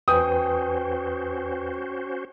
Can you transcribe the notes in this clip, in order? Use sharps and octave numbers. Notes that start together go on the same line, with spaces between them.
E2 C#4 F#4 B4 C5 G5 G#5 D#6